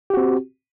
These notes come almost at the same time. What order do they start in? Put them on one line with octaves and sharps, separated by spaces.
G4 F#4 C4